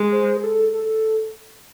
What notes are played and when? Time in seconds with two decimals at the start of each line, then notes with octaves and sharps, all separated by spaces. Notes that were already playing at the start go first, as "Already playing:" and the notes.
Already playing: G#3
0.12 C5
0.37 G#4
0.43 A4
0.73 A4